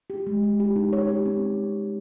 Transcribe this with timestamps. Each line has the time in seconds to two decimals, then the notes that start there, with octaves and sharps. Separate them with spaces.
0.10 G4
0.27 G#3
0.43 G#3
0.60 G4
0.76 D#4
0.93 C#5
1.09 G4
1.26 C4